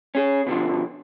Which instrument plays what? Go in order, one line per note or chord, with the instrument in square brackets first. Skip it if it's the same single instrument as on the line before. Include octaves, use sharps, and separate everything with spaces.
[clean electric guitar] C#4 G#4
B2 D3 F3